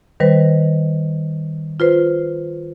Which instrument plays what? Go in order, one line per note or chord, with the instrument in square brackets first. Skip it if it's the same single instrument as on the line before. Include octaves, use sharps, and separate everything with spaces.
[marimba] D#3 G3 B4 C5
F4 B4 C5